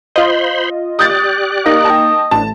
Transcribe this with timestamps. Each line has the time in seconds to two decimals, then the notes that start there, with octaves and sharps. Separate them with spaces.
0.16 F4 C5 D#5 B5 C6
0.99 G4 D5 D#6 F#6 G6 A6
1.66 A#3 D#4 D#5 A#6
1.85 G5 A5
2.31 A1 D4 A5